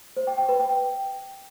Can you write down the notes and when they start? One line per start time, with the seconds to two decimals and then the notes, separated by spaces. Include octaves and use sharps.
0.17 C5
0.27 G5
0.38 G5
0.49 B4
0.59 G5